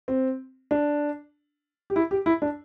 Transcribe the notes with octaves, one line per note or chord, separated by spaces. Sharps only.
C4
D4
G4
E4
G4
E4
D4